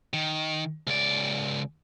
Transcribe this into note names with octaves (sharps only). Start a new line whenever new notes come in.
D#3
C#2 D5